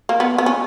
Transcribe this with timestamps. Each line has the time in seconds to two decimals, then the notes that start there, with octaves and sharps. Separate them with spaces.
0.09 A#3
0.20 B3
0.38 B3
0.46 C#4